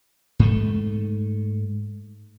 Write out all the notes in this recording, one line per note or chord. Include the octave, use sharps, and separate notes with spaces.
G#2 A3